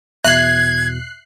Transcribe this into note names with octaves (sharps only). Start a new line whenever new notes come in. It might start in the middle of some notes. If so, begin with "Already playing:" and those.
E2 B2 E5 F#6 G#6 C7 F#7